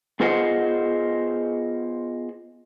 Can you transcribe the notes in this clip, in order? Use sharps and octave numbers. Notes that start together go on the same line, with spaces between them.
B3 F4 G#4 C5 D#5 F#5